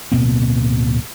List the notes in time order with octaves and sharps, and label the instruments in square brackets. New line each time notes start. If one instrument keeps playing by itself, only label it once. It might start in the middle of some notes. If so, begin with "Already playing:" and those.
[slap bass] D1 B2 A#3 C4